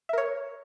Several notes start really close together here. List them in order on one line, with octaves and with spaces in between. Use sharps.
E5 A#4 C#5